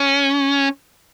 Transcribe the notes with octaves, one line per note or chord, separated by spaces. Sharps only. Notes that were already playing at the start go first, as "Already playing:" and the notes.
Already playing: C#4